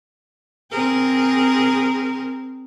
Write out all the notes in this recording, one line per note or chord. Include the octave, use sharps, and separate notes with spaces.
C4 G#4 A#4